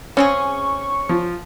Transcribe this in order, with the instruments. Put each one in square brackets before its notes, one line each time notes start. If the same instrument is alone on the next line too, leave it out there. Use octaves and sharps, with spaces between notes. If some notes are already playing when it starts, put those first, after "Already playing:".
[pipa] C#3 C4 G#4 [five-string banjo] C#4 [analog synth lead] C#6
[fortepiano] F3